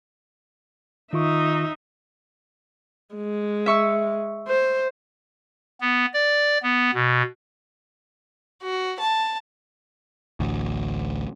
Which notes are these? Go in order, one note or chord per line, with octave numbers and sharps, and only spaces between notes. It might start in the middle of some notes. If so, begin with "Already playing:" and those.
D#3 D#4 F4 E5 C#6
G#3
E5 C#6 E6
C5
B3
D5
B3
B2
F#4
A5
A1 D2